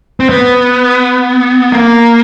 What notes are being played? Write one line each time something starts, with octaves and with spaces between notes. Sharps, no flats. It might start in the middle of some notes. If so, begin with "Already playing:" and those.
C4
B3
A#3